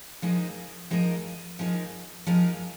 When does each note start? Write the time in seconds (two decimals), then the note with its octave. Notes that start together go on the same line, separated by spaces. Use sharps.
0.22 F3 G#3 D#4 A#4
0.91 F3 G#3 D#4 A#4
1.59 F3 G#3 D#4 A#4
2.27 F3 G#3 D#4 A#4